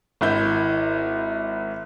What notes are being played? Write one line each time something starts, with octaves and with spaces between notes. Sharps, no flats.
G#1 E4 G6